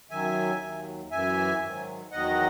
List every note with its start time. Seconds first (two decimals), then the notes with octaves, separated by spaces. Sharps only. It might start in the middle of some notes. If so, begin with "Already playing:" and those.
0.11 F#2 D#3 F#3 E5 G#5
0.62 D#2 D#3 F#3
1.11 F#2 E3 E5 G#5
1.61 G#2 D#3 F#3
2.11 E2 D#3 F#3 D#5 F#5